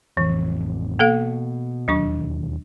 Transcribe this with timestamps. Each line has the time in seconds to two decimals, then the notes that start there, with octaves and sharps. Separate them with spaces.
0.17 A1 F2 E3
0.99 B2 A#3 A4 F5
1.88 E1 D#2 F#3 D4 C#6